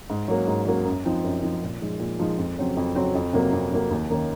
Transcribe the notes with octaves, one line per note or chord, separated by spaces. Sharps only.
G#2
F#3 A#3 C#4
G#2
F#3 A#3 C#4
F#2
F3 C4 D#4
F#2
F3 C4 D#4
A#2
F3 G#3 D#4
A#2
F3 G#3 D#4
F2
C#3 F#3 C4
F2
C#3 F#3 C4
F2
C3 F#3 A#3
F2
C3 F#3 A#3
D#2
D#3 A#3 C#4